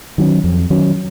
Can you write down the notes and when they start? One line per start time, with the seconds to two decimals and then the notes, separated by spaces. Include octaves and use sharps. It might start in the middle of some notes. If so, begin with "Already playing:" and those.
0.18 D#3 F#3 C#4
0.44 F2
0.70 D#3 F#3 C#4